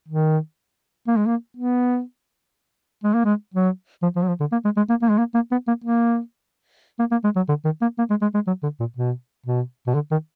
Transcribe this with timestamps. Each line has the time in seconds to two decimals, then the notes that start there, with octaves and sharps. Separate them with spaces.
0.08 D#3
1.08 A#3
1.17 G#3
1.26 A#3
1.57 B3
3.04 G#3
3.14 A#3
3.25 G#3
3.54 F#3
4.02 F3
4.16 F3
4.23 F#3
4.28 F3
4.40 D3
4.52 A#3
4.65 G#3
4.77 G#3
4.89 A#3
5.02 A#3
5.10 G#3
5.18 A#3
5.35 A#3
5.52 B3
5.68 A#3
5.84 A#3
6.99 A#3
7.11 A#3
7.24 G#3
7.36 F#3
7.48 D3
7.65 D#3
7.82 A#3
7.98 A#3
8.10 G#3
8.22 G#3
8.34 G#3
8.47 F#3
8.63 D3
8.80 A#2
8.97 B2
9.46 B2
9.87 B2
9.94 D3
10.11 D#3